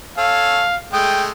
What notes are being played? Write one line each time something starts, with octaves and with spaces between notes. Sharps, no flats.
C#4 A4 F5
G#3 A3 G5 D#6